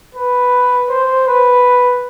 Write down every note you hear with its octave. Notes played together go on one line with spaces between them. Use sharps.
B4
C5
B4